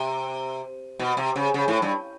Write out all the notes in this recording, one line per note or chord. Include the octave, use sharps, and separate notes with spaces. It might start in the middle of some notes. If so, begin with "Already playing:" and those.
Already playing: C3
B2
C3
C#3
C#3
A2
G2